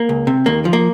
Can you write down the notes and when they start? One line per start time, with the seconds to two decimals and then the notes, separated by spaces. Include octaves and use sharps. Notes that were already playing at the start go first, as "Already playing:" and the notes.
Already playing: A#3
0.09 C#2
0.27 C3
0.46 D#2 A#3
0.65 F3
0.73 A#3